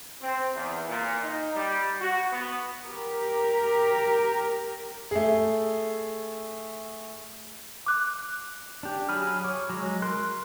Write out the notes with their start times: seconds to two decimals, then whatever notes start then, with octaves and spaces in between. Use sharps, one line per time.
0.21 C4
0.55 E2
0.87 A#2
1.22 D#4
1.55 G3
2.00 F#4
2.32 B3
2.86 G4 A#4
5.11 A3 G#4
7.86 D6 F#6
8.83 D4 G4
9.09 F#3 G#4 B5 F6
9.44 C#5 D6
9.70 F#3 G#3
10.02 A#4 C6 F#6